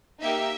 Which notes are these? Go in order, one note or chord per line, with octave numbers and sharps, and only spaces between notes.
A#3 D#4 G4 E5